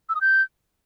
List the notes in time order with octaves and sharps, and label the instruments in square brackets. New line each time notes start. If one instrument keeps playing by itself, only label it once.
[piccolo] E6
D#6
G6